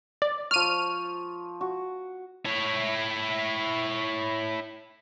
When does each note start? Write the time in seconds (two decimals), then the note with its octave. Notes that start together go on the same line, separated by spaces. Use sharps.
0.22 D5
0.51 F3 C#6 F6 D#7
1.61 F#4
2.45 E4 C#5